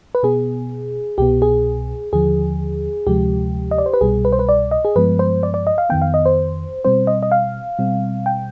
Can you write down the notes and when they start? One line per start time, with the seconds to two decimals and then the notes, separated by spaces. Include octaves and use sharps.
0.15 B4
0.23 B2 B3 G#4
1.18 C2 B2 B3 G4
1.42 G#4
2.12 D#2 D3 F3 G#4
3.06 D2 C3 F3 G#3 G4
3.71 D#5
3.78 D5
3.86 C5
3.93 B4
4.01 C2 B2 G3 G#4
4.25 B4
4.33 C5
4.39 B4
4.49 D5
4.71 D#5
4.85 G#4
4.96 G2 F3 G#3 B3 B4
5.19 C5
5.43 D5
5.54 D5
5.67 D#5
5.78 F5
5.90 F2 D#3 B3 G5
6.02 F5
6.14 D#5
6.26 C5
6.85 B2 G3 C4 C5
7.07 D#5
7.23 D#5
7.32 F5
7.79 B2 G3 C4
8.26 G5